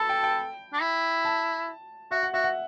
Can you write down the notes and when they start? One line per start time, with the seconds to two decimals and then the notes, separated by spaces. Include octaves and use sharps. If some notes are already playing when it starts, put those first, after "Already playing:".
Already playing: A4 A5 B5
0.09 G5
0.23 G5
0.73 D4
0.81 E4
1.25 A5
2.11 F#4 E5
2.23 F#5
2.33 F#4 E5
2.44 F#5